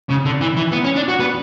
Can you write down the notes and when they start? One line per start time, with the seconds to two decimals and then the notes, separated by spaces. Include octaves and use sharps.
0.10 C#3
0.25 D3
0.41 E3
0.57 E3
0.72 B3
0.84 C#4
0.96 D4
1.09 F#4
1.20 B3